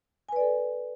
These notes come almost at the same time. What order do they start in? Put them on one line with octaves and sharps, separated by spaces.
G#5 B4 D5 A4